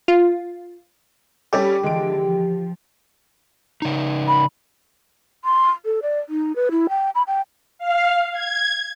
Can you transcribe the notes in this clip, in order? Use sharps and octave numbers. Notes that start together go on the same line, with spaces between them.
F4
G3 C#4 G4 A4
D3 E3 F3 G#3 D7
F3
C#3 D#4
B5
C6
A4
D5
D#4
B4
E4
G5
B5
G5
F5
G#6